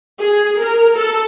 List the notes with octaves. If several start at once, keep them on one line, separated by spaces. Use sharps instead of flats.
G#4
A#4
A4